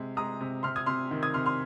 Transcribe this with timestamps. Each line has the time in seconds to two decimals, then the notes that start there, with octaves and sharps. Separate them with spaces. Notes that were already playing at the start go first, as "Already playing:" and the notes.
Already playing: C3 G#3
0.17 G#3 A#5 D#6
0.41 C3
0.63 C3 C6 F6
0.76 D#6 G#6
0.86 C3 C6 F6
1.11 D#3
1.23 D#6 G#6
1.34 C3 C6 F6
1.46 C6 F6